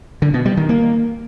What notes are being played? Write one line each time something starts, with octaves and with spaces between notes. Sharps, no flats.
D3
B2
G3
D#3
A#3